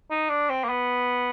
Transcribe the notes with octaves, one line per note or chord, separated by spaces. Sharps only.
D#4
D4
C4
A#3
B3